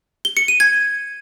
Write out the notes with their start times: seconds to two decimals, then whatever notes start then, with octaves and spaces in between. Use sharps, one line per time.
0.25 G7
0.37 C#7
0.48 D#7
0.60 G#6